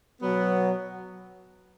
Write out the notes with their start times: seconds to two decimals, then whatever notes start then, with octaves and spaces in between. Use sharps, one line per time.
0.21 B2 F#3 B3